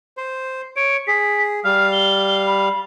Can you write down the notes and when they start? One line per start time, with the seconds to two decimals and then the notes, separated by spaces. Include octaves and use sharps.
0.17 C5
0.76 C#5 D7
1.08 G#4 B6
1.64 G3 F5 F6
1.92 G7
2.47 B5